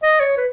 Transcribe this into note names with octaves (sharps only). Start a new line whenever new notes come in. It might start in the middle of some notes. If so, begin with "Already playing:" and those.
D#5
C#5
B4